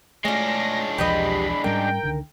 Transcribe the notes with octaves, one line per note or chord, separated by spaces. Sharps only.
G#3 A3 C#4 D4 F4 A#6
B1 E2 F3 G4 B4 D#5 B5
G#2 G3 C#4 A#4 G5
C#2 D3 D#3